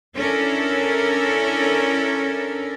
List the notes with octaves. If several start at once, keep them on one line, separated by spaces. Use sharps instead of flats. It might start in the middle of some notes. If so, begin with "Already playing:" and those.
C#4 D4 E4 A4 A#4